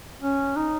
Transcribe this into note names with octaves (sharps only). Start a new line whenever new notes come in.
C#4
D#4